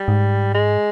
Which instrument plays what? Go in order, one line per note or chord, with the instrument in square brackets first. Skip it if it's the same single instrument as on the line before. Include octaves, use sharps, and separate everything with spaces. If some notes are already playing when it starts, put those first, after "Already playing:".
Already playing: [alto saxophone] G3
[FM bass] G#2
[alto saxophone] G#3